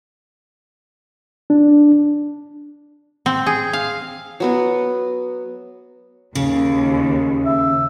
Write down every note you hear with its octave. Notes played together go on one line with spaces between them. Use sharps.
D4
C4
G#4
F5
F#3 B3 F#4
D#2 C#3
E5